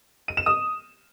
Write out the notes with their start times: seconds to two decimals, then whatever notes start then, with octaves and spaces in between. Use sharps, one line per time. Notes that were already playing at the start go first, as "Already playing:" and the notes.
0.28 D#7
0.37 E7
0.46 D#6